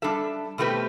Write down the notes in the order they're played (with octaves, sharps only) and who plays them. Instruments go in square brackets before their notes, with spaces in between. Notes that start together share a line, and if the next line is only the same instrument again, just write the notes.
[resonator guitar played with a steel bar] G3 D4 A4 E5
B2 A3 C4 G4 B4